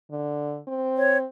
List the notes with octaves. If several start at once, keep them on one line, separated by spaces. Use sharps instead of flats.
D3
C4
C#5